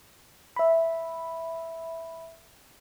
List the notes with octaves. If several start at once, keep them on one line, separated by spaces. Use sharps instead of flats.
E5 B5